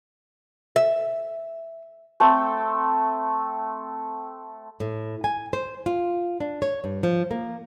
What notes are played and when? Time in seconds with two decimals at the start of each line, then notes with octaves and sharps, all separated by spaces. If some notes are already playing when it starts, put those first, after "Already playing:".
0.76 E5
2.20 A3 C4 A4 G5
4.80 A2
5.24 G#5
5.53 C5
5.86 F4
6.40 D4
6.62 C#5
6.84 G2
7.03 F3
7.31 A#3